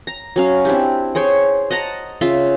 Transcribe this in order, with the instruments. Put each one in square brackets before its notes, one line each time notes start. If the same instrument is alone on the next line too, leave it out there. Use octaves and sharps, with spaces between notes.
[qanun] A#5
F#3 C#4 F5
C4 D4 E4 G4
G#4 C5 C#5 G5
D#5 F#5 A5 A#5
C#3 F4 E5 C6